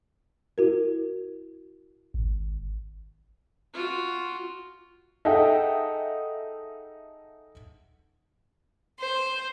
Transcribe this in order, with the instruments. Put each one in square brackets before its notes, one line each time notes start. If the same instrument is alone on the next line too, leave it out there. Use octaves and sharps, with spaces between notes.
[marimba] E4 F#4 A#4
[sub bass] G#1
[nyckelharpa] F4 F#4
[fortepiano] D#4 G#4 A4 E5 F#5 G5
[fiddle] C5